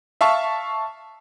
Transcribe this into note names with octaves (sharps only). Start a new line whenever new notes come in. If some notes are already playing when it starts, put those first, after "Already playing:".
E5 F5 A5 C#6